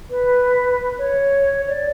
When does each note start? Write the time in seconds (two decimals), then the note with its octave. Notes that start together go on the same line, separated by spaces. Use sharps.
0.10 B4
0.98 C#5
1.68 D5